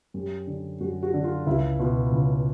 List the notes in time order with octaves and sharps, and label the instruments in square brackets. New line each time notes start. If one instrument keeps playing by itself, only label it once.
[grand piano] F#2 G4
D3
F#2 F#4
F#4
D3
F4
C#2 E4
B2 F4
C#2